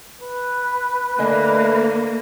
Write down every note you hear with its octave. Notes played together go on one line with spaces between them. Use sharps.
B4
D3 A3 A#3 D#5 G#5